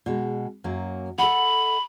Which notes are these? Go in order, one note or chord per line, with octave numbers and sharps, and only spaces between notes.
B2 G#3
F#2 F#3 A#3
A4 D#5 F#5 B5